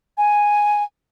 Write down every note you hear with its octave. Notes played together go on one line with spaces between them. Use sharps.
G#5